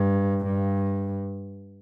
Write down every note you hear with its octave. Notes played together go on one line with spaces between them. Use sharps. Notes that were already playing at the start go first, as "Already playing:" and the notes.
Already playing: G2
G2